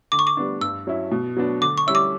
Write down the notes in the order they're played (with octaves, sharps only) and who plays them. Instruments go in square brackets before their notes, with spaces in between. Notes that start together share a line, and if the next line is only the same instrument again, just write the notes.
[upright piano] D3 [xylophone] D6
[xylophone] C#6
D6
[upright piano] G3 B3 D4
[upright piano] G2 [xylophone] E6
[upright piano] F#3 C#4 E4
B2
F#3 B3 D4
[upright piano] D3 [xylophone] D6
[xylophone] C#6
[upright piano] G3 C#4 E4 [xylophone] E6
[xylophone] D6